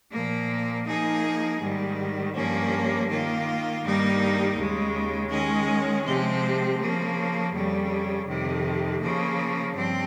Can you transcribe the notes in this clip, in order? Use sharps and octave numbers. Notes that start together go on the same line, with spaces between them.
A#2 F3 A#3
F3 A#3 D#4 G#4
G#2 D#3 G3
G2 F3 A#3 C#4
D#3 A#3 F4
G2 D#3 G3 A#3 D#4
D#2 C#3 G#3
D#3 G#3 C#4 G#4
C3 F3 G#3 C4
C#3 F3 A#3
F2 C#3 G3
F2 C3 D#3
C#3 F3 A#3
G2 F3 C4